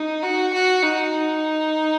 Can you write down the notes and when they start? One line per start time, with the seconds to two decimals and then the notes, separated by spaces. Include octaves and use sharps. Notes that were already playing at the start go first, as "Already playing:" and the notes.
Already playing: D#4
0.23 F#4
0.53 F#4
0.83 D#4